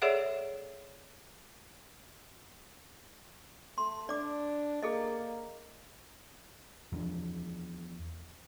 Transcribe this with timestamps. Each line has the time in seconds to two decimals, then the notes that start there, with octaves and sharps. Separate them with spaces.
0.02 G#4 A4 C#5 D5 E5 F#5
3.78 A3 C6
4.09 D4 D5 D6
4.83 A#3 G#4 A4 D#5
6.92 E2 F3 C4 D4